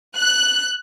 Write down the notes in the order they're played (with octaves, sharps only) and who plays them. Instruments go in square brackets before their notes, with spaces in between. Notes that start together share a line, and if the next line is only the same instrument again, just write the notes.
[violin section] F#6